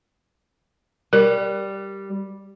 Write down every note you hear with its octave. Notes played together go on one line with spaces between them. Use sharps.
G3 A#4